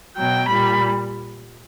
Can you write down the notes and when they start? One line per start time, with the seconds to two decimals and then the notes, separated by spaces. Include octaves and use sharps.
0.17 B2 F#3 G5
0.49 A#2 G3 B5